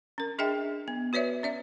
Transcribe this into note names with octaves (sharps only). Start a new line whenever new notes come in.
C#4 A#4
D4 G#4 D#5 E5 G5
B3
F#4 B4 C#5 D5 E5
C#4 D5 E5